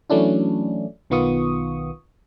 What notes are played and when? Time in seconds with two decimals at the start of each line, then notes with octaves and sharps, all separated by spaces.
0.10 E3 F#3 A3 C#4 D4 E4
1.10 B1 D#3 B3 F4 C#6 D#6